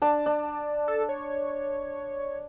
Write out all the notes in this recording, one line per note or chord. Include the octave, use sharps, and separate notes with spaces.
D4 A5
D4
A4
C#5